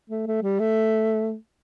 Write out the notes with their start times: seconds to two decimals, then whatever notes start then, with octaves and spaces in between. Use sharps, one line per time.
0.10 A3
0.27 A3
0.42 G3
0.59 A3